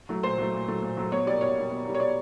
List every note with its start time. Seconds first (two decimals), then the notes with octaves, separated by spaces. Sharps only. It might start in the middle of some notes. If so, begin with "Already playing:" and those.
0.09 F#3 A3
0.23 A#2 C5
0.38 F#3 A3
0.53 A#2
0.68 F#3 A3
0.83 A#2
0.97 F#3 A3
1.11 B2 C#5
1.26 G3 A#3 D5
1.41 B2 C#5
1.56 G3 A#3
1.71 B2
1.85 G3 A#3
1.94 C#5
2.00 B2 D5